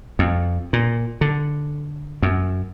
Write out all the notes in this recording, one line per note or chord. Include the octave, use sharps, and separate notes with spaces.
F2
A#2
D3
F#2